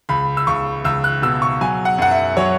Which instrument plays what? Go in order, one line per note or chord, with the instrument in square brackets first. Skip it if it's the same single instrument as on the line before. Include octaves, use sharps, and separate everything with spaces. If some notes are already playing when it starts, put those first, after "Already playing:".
[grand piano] C#2 B5
E6
C#2 C#6
C#2 E6
F#6
B2 E6
C#6
F#3 G#5
F#5
F#2 F#5
E5
F#3 C#5